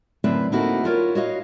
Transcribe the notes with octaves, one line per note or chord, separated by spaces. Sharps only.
F#2 A2 D3 C4 B4 E5
A#3 C4 D#4 E4 F#4 A4
E4 F4 A#4 C#5
F#4 C#5 D#5 F5